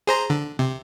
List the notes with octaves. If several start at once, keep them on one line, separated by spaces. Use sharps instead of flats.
G#4 C5 A#5
D3
C3